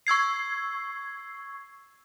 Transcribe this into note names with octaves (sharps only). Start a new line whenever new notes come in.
C#6 E6 G#6 C7